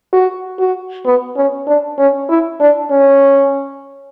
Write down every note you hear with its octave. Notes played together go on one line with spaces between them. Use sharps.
F#4
F#4
B3
C#4
D4
C#4
E4
D4
C#4